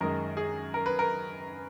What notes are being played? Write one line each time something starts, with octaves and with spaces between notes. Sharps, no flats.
F#2 D#3 G#3 A#4
G#4
A#4
B4
A#4